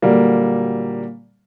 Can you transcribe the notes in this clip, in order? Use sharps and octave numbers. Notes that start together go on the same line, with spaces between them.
A#2 D3 F#3 G3 A#3